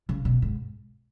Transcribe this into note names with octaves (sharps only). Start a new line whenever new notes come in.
C#3
B2
G#2